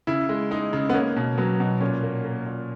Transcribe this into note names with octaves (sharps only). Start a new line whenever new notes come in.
C#3 E4
G#3
G#3 D#4
C#3
B3
A#3 C#4
B2
F#3 B3
B2
A#2 C#4
A#3
A#3
A#2